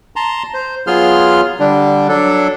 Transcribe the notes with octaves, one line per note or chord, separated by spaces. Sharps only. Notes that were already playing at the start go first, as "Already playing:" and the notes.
A5 A#5 C6
C5
F#3 B3 F4 G#4 C6 F6
D3 G3 D4
F#3 D4 A4